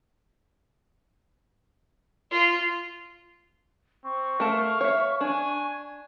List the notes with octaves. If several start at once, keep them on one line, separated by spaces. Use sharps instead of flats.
F4
C4 C#6
A3 A#4 F5 A5
C#5 E5
D4 G#5